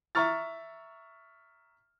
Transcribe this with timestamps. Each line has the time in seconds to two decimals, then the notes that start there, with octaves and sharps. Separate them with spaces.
0.15 E5 A#5 C#6 F6 A6